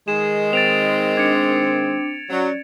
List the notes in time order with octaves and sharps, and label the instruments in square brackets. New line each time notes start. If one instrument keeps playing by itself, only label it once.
[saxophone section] D#3 G#3 [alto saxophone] G#4 [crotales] E7
[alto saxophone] C4 [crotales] A6 D7 F7
[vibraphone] D4 D6 [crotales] G#6 C#7
[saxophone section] F#3 [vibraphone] C#4 D5